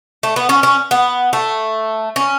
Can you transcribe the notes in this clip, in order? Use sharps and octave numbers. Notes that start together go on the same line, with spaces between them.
A3
B3
C#4
C#4
B3
A3
C#4